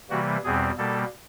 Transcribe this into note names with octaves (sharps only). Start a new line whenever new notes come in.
C3 E3 G3 A#3 F#4
E2 B2 G3 C4 G#4
B2 G3 A#3 A4